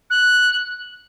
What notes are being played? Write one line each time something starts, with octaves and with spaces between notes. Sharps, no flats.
F#6